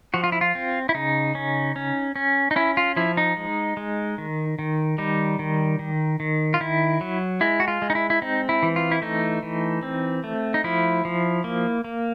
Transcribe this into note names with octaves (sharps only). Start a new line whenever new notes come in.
F3 F#4
F4
E4
F4
C4
E4
C#3 D#4
C#4
C#4
C#4
D#4
C#4 E4
F4
F3 E4
D#4
G#3
G#3
D#3
D#3
G3 D#4
D#3
D#3
D#3
F4
D#3 E4
F#3
G#3 E4
F#4
F4
G#3
D#4
E4
E4
C4 D#4
E4
E3
F4
E4
A3 D#4
E3
C4
A3
D#4
F3 E4
F3
A#3
A#3